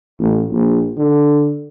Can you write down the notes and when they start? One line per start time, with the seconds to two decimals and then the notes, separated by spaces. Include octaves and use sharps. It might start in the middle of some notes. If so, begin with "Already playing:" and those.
0.19 A1
0.51 A#1
0.98 D3